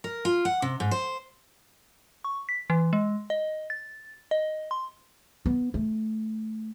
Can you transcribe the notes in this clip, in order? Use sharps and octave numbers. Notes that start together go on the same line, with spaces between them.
A#4
F4
F#5
C3
G#2
C5
C#6
B6
E3
G#3
D#5
A6
D#5
C6
B3
A3